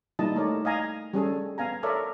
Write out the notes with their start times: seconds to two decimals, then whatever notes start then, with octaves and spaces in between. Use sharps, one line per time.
0.19 G3 A#3 D#4 E4 D#5 A5
0.36 A3 D#4 A#4 C#5 D5
0.65 D#5 F5 G#5 A#5
1.13 G3 C#4 G#4 A4
1.58 B3 F5 G#5 A#5
1.83 A4 A#4 C#5 D5 E5 F5